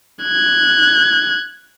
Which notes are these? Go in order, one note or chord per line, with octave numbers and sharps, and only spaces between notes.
F#6 G#6